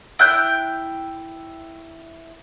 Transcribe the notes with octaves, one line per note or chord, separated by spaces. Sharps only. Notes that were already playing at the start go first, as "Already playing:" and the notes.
E4 G5 F#6 G6